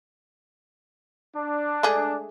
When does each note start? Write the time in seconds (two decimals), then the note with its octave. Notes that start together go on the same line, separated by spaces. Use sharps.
1.35 D4
1.83 G#3 A3 G#4